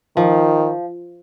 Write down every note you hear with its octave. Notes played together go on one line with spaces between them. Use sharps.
D#3 F3